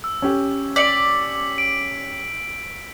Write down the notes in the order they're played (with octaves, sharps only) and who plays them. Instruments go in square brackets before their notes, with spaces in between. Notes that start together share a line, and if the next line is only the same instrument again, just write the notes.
[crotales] E6
[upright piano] C#4 G4
[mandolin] D5 [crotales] B6 C#7 F#7
[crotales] D7